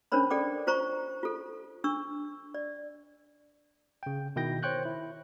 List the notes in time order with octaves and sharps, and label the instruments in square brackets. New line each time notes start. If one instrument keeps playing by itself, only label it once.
[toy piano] C#4 D4 A#4 C5 C#5 B5
A4 D5 G5 D6
F4 C5 A#5 C#6
F4 A4
D4 C#6 E6
D5
[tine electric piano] C#3 G5
B2 D#3 E4 G5 G6 A#6
C5 C#5 G5 C#6 F#6 G6
E4